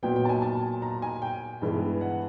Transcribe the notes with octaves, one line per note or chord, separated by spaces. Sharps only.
A#2 F#3 B3 G5
G5
A5
G#5
A5
A#5
G#5
G5
G2 E3 G#3 B3
F#5